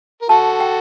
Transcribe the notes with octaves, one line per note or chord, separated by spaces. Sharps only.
A#4
F#4 A4 A5
G5